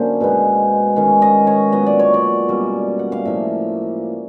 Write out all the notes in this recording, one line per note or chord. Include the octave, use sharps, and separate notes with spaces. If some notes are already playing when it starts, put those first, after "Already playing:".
Already playing: D3 F#3 A#3 C#4 C5
B2 G#3 B3
D#3 G#3 C#4
D#5
C#5
A#2 F#3 B3 D#5
D5
C#5
D5
B2 G3 A#3 C#4
F#5
F5
A2 F3 A#3 E5